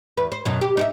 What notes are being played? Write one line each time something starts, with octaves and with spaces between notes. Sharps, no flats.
E2 B4
C5
F#2 B2 F#3
G4
D#4 G4 E5